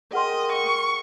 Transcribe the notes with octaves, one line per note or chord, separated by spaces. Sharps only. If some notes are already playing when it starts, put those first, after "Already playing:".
G#4 A#4 D#5 F#5 G5 C6
C#6